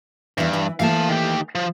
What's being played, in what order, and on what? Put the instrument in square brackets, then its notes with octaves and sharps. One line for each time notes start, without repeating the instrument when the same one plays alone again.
[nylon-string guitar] E2 E3 [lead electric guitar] G2
[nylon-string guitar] E3
[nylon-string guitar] E3 A3 A#3 [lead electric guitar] F5 A5
[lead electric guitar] D#3 G4
F3